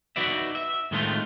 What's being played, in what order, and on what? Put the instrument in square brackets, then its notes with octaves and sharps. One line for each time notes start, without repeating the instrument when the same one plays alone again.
[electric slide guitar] D#4 F#4 B4 D5 E5
E5
A2 D#3 G#3 A3 C4 F4